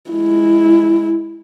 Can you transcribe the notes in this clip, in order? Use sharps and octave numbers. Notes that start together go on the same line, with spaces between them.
G#3 E4